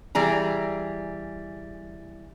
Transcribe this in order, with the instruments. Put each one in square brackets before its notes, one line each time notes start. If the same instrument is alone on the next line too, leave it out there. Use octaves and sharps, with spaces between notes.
[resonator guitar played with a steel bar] E3 G3 G#4 A#5